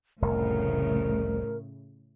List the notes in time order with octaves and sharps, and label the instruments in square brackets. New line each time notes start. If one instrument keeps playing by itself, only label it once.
[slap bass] F1 C2 F2 [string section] A2 C#3 [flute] A#4